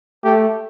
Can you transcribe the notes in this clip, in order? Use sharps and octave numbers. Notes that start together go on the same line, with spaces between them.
A3 G4